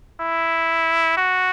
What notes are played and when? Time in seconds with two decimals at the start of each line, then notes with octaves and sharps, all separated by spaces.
0.21 E4
1.17 F#4